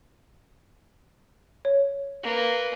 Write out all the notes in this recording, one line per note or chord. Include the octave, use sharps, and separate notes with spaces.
C#5
A#3 B4